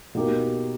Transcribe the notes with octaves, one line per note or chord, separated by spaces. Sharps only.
B2 A#3 D#4 G4 A#4